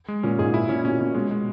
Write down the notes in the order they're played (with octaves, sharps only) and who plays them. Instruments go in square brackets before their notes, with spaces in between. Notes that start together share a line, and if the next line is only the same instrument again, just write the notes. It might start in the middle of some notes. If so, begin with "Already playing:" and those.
[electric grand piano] G#3
[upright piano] A#2 [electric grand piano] C#4
[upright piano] G#2 [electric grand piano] G#4
[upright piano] A#2 [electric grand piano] E4
[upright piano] A#2 [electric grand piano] C#4
[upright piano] B2 [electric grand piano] C#4
[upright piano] B2 [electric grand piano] C#4
[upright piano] B2 [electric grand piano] G#3
[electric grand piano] G#3